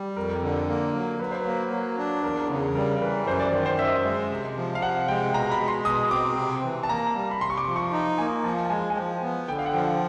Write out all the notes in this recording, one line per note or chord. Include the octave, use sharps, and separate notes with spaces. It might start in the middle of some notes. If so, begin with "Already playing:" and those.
Already playing: G3
F2 A#4
D3
A#3
F#3
F#3 B4
C5
A#3 B4
F#3
D4
E2 A#4
C#3
G3 A#4
A#4
E3 B4
F#2 C5
D5
D#3 D5
C5
F#2 E5
D#5
E5
G#3
C3
F3
F5
C3 F#5
G#3 G5
B2 A#5
B5
G#3
C6
B2 D#6
C4 D6
C3
E3
A5
A#3 A#5
G3
B5
C3 C6
C#6
D6
F3
C#6
D#4
A#3 G#5
F3 A5
A5
G#3 G#5
G#5
F3 G5
B3
D3 G5
F5
F#5
F3 G5